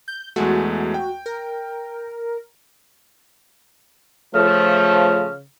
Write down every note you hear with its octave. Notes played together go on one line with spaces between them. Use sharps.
G6
E2 G#3 A3 F#4
G5
A#4
C#3 F3 A3